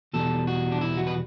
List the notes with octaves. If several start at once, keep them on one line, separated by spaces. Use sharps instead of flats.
E2 B2 G3 A4
F#4
D4
E4
F#4
B4